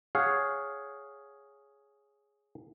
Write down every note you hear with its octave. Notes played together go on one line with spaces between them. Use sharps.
G#4 C#5 F5 F#5